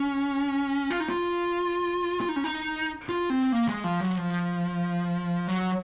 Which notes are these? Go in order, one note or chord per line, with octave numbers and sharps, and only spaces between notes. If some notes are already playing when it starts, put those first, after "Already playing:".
Already playing: C#4
F4
D#4
F4
F4
D#4
C#4
D#4
F4
C4
A#3
G#3
F3
F#3
F3
F#3